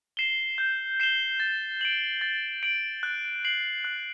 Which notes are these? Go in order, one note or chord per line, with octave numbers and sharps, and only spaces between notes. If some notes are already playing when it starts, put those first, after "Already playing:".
C7 E7 G7
G6
C7 E7 G7
A6
D7 F#7
A6
D7 F#7
F#6
C7 F#7
F#6